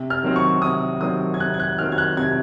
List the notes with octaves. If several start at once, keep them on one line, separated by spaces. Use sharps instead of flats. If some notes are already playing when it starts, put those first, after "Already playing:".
Already playing: C3
F6
D#3 F#3 C4
C#6
C3 D#6
D#3 F#3 C4 D#6
G#6
C3 F#6
G#6
F#6
D#3 F#3 C4 F6
G#6
F#6
C3 G#6